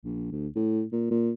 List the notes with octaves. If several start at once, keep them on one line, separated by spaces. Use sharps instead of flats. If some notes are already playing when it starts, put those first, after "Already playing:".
A#1
D2
A2
A#2
A#2